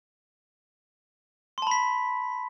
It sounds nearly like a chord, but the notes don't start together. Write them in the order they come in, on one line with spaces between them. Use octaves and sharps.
C6 A5 B5 B6